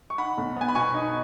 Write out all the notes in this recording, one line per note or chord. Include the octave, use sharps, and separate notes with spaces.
C#6
D#4 F#5 B5
B1
B3 G#5
B5
B2 G#5 C#6
D#4